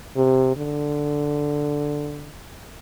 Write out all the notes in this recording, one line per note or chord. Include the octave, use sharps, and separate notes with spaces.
C3
D3